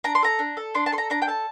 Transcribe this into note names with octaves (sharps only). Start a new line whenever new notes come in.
D4 A#5
C6
A4 A#5
D4
A4
D4 C6
A5
A4 C6
A#5
D4 A#5
G5
A4 A5